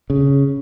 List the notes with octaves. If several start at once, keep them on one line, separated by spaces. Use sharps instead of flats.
C#3